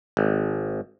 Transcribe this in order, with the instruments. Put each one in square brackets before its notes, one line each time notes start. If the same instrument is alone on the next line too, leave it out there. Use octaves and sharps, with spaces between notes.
[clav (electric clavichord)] G#1